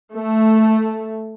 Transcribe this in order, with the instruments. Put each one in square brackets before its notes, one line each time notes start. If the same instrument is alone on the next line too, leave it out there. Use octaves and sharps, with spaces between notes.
[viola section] A3